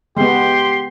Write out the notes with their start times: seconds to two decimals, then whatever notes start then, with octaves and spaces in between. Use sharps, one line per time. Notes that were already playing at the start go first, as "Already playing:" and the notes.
0.17 G#3 B3 G4 C6